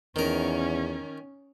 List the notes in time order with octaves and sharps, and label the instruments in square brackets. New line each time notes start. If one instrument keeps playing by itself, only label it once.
[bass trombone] E2 [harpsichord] D#3 A#4 [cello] C#4